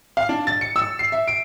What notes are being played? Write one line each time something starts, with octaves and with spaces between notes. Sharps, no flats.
F5
D4
A6
C#7
E6
C7
E5
D7